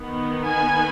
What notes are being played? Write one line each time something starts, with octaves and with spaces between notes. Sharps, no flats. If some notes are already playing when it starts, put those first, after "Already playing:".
Already playing: D#3 B3
G#5